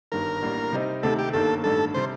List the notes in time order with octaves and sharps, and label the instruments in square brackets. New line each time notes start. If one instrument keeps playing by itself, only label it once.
[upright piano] G1 G2 D#3 [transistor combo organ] A#4
[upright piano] A1 A2 G3 A#3 D4
C3 G3 C4 D#4
[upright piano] D2 C3 D#3 [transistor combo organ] A4
[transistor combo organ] G4
[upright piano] G1 G2 D#3 A#3 [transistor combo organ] A4
[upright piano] A1 G2 D#3 [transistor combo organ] A4
[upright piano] C3 G3 [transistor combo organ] C5